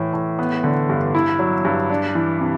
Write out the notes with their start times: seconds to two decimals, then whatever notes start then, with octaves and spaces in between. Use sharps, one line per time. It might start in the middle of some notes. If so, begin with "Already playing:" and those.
Already playing: A2 E3
0.14 A2
0.39 B3
0.64 D3
0.89 G2
1.15 E4
1.39 F#3
1.65 G2
1.90 D4
2.15 E3
2.41 C3